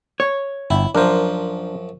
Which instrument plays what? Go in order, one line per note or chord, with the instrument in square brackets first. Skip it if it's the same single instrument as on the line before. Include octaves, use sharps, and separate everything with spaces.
[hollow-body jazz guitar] C#5
[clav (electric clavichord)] G1 [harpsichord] E4
[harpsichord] F#2 F3 [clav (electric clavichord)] D4 A#4 C5